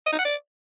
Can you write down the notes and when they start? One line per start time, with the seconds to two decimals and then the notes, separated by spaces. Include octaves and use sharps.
0.06 D#5
0.13 D#4
0.19 F#5
0.25 D5